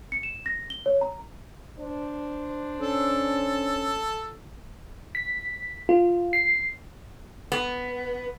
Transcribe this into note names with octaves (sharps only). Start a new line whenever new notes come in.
C#7
E7
A#6
G7
C#5
A#5
D4 C5
C#4 A4
B6
F4
C7
B3